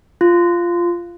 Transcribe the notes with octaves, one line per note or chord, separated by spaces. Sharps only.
F4